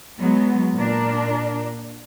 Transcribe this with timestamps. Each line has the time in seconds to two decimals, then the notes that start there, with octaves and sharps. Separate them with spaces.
0.21 F#3 G#3 B3
0.78 A#2 D4 A#4